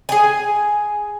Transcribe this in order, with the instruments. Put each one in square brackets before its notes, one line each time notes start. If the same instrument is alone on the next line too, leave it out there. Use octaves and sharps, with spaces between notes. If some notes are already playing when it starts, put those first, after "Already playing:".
[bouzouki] G#4 G#5